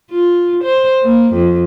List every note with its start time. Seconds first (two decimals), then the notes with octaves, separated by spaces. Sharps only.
0.11 F4
0.64 C5
1.03 A#3
1.34 F2